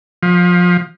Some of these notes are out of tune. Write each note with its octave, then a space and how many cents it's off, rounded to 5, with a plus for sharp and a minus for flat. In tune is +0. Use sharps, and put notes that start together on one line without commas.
F3 +25